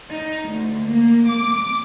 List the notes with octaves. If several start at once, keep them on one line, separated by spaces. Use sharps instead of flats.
D#4
D2
A#3
D6